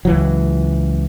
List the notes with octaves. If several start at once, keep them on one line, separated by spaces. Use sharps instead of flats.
C#2 E3 F#3